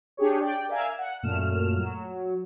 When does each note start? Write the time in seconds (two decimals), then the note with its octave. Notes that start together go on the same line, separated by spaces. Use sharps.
0.17 D4 G4 G#4 C#5
0.40 D5 G5
0.68 A#4 D5 E5 F5 G#5
0.98 F#5
1.23 F#2 A#2 A3 F6 E7
1.77 F#3